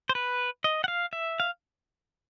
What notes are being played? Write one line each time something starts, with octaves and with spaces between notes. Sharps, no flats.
C5
B4
D#5
F#5
F5
E5
F5